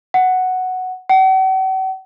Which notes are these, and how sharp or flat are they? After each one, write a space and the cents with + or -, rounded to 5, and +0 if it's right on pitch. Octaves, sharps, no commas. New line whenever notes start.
F#5 +0
F#5 +45